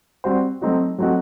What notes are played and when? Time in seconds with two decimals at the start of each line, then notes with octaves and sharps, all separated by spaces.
0.24 G3 C4 F#4 C5
0.61 F#3 A3 C4 D#4 F#4
0.98 F#3 A3 C4 D#4 F#4